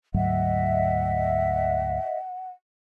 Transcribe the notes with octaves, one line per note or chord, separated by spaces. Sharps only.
D2 G#2 F#3 D#5 E5 F#5